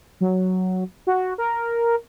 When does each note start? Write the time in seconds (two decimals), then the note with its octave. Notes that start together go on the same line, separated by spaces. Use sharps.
0.21 F#3
1.07 F#4
1.38 A#4